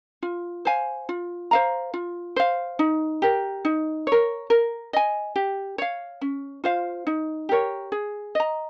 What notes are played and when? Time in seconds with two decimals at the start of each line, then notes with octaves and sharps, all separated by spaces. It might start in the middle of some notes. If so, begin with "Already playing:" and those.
0.23 F4
0.65 C5 F5 G#5
1.09 F4
1.51 C5 F5 A#5
1.94 F4
2.36 C5 F5
2.79 D#4
3.22 G4 A#4
3.65 D#4
4.07 A#4 C#5
4.50 A#4
4.93 D#5 G#5
5.36 G4
5.78 C#5 F5
6.21 C#4
6.64 F4 C5 F5
7.07 D#4
7.49 G4 A#4 C#5
7.92 G#4
8.35 D#5 A#5